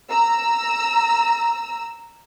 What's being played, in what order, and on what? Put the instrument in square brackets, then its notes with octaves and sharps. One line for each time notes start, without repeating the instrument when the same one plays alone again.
[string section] A#5 E6